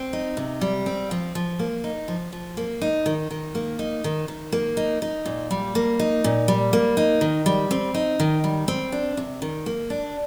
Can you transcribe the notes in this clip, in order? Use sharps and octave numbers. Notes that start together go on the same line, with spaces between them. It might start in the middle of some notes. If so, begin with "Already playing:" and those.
Already playing: C4
D#4
C3
G3
C4
F3
F3
A#3
D#4
F3
F3
A#3
D#4
D#3
D#3
A#3
D#4
D#3
D#3
A#3
D#4
D#4
A#2
G3
A#3
D#4
A#2
G3
A#3
D#4
D#3
G3
C4
D#4
D#3
G3
C4
D4
C3
D#3
A#3
D4